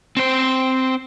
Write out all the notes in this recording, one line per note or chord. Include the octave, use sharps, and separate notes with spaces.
C4 C5